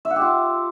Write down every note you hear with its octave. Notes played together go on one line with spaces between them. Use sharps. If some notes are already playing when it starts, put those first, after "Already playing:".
E5
F#5
G4
F4